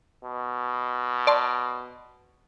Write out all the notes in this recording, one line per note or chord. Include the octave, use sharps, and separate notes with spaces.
B2
D5 A5 C6